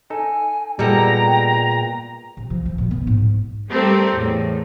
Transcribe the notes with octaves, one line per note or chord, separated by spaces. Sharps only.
D#4 A4 G#5
A#2 G3 G#3 B3 A4 D#5 G5 A#5
C3
F3
F3
B2
B3
G#2
G#3
G3 A3 C4 G4 A4 A#4
E2 A2